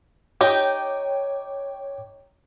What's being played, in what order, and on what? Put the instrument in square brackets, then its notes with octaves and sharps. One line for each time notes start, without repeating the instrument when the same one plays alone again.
[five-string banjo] D#4 G4 [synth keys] C#5 G5 [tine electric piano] D6